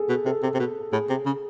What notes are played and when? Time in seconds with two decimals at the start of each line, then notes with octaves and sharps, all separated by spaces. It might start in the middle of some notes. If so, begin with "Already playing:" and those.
Already playing: G#4 A4
0.09 B2
0.26 C3 A4
0.43 C3
0.55 C3
0.60 B2
0.93 A2 G#4
1.10 C3
1.26 C#3